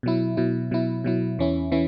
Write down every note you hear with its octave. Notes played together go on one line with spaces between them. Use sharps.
B2 F#3 E4
B2 F#3 E4
B2 F#3 E4
B2 F#3 E4
E2 E3 C#4 E4
E3 C#4 E4